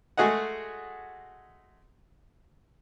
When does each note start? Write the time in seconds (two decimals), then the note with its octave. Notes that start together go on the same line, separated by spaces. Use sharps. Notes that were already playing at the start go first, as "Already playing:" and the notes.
0.17 G#3 A3 F#4 G#4 D#5 F#5